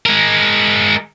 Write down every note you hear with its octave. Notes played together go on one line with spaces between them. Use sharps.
G#3 A#4